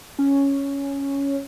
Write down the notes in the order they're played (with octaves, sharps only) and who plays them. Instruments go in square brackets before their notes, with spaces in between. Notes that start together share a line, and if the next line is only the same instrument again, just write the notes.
[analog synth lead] C#4